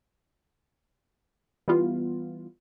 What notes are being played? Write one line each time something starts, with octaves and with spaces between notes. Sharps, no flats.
E3 G3 B3 F4